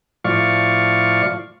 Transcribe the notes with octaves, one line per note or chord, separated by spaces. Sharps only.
A2 F3 D5 F5 C#6